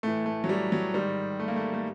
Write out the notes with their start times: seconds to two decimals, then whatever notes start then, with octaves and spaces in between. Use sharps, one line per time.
0.03 A2 E3 A3
0.26 A3
0.44 F#3
0.49 G3
0.72 F#3
0.94 G#2 D#3 G3
1.40 A3
1.48 A#3
1.56 A3
1.74 A3